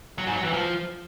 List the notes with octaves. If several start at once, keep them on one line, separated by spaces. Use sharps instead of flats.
F#3
G#2
F#3
E3
F3